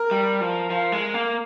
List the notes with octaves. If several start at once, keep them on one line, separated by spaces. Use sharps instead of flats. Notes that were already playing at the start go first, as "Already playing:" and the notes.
Already playing: A#4
G3
F3
F3
G#3
A#3